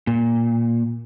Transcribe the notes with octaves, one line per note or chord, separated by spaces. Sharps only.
A#2